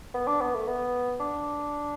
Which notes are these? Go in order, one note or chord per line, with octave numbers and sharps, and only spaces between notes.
B3
D4
B3
A3
B3
D4